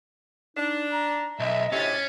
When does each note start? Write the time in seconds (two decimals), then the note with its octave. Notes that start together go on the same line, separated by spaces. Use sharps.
0.56 D4 D#4
0.92 A#5
1.39 B1 D#5 E5
1.72 D2 A2 C3 C#4 A6 B6